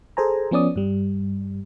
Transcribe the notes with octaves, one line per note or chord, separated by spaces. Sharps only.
G#4 A4 C5 G#5 A#5
F3 B3 C#4 D5 D#6
G2 G3